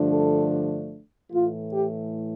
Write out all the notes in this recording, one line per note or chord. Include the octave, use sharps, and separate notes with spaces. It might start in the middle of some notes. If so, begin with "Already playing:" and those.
Already playing: G2 D3 F3 A3 D4
A4
A2 E3 A3 F4
G4